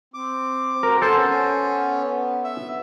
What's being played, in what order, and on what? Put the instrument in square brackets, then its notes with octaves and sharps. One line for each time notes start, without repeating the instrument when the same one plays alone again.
[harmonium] C4 [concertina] D6
[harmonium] F#4 C5 [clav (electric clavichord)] A#4
[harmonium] B3 [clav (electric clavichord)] A4 C5 [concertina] G#5 A5
[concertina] C#4
E5